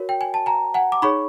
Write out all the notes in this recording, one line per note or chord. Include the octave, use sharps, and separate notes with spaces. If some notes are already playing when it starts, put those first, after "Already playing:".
Already playing: F#4 A#4 C#5
G5
G#5
A5
G#5 A#5
F#5 G#5
D6
D#4 G#4 C#5 B5 C#6